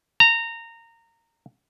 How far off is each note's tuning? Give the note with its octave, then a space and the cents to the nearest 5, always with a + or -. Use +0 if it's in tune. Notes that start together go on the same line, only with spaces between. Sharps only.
A#5 -20